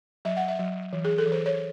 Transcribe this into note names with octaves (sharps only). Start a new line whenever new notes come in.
F#3 E5
F#5
E5
F#3
E3
G#4
A4
E3
C5
C#5